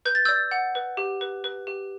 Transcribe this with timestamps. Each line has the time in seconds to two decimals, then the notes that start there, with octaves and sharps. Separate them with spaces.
0.05 B4 G6
0.15 A6
0.25 D5 E6 G6
0.51 F#5
0.75 B4
0.97 G4
1.21 B4
1.44 B4
1.67 G4